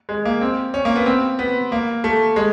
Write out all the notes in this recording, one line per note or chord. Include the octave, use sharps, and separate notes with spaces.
G#3
A#3
C4
C#4
A#3
B3
C4
B3
A#3
A3
G#3